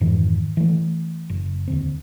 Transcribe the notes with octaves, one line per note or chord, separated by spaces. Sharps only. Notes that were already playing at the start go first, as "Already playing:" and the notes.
F2 G#2 D#3 E3
E3 A3
F#1
D#2 D3 C4